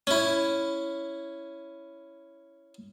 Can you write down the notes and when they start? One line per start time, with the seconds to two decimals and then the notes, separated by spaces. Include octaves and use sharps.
0.07 C#4 E4